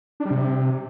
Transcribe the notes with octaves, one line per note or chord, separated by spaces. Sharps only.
D4
G3
C3